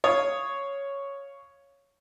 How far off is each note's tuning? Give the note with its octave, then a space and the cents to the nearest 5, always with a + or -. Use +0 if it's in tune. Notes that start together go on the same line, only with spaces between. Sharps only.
C#5 +0 F5 +0 D#6 +0